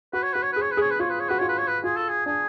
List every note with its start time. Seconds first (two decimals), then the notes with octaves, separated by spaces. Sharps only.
0.13 F#4 B4
0.23 C#5
0.33 F#4 B4
0.43 C#5
0.53 G#4 B4
0.62 C#5
0.72 B4
0.77 G#4 C#5
0.91 B4
1.00 F4 C#5
1.10 B4
1.20 C#5
1.29 F#4 B4
1.39 F4 C#5
1.49 B4
1.58 C#5
1.68 B4
1.84 F4 G#4
1.97 A4
2.09 G#4
2.26 D4 G#4